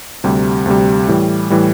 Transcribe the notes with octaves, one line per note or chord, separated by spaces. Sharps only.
D2 C3 G3
D2 C3 G3
A2 E3 G3
A2 E3 G3